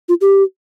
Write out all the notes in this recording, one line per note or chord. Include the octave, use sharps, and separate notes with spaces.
F4
G4